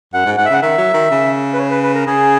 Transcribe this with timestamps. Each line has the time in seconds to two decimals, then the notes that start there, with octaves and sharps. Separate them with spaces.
0.14 F#2 F#5
0.26 G#2
0.38 G#2 F#5
0.45 E5
0.50 C#3 F#5
0.62 D#3 E5
0.78 F#3
0.94 D#3
1.11 C#3
1.54 B4
1.59 C#5
1.71 B4
1.83 B4
1.95 A#4
2.07 C#3 G#4